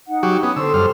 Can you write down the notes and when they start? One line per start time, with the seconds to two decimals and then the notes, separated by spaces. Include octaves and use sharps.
0.08 D#4 F#5
0.23 F#3 F#4 G4
0.43 B3 C#4 D#6
0.56 D3 A4 C5 E6
0.74 F#2 G3 F6